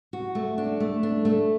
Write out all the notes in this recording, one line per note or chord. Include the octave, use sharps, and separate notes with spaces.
F#4
A3
D4
A3
D4
A3